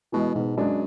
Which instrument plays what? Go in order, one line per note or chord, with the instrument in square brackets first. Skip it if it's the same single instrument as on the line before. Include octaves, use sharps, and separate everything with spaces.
[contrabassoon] B2 [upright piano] E3 G#3
[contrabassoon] G#2 [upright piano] B2
[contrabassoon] F#2 [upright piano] G#3 D4